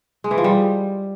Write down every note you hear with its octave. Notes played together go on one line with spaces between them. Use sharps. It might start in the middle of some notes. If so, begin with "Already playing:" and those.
G#3
E3
F3
G3